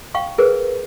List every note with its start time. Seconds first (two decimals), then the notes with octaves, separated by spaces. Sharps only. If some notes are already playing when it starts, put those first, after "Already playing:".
0.15 F5 G5 C#6
0.38 G#4 A#4 B4